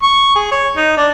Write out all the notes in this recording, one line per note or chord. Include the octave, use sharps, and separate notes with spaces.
C#6
G#4
C#5
D#4
D4